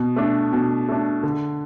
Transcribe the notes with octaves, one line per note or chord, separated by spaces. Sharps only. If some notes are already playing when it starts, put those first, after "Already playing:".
Already playing: B2
A3 D4
B2
A3 D4
D3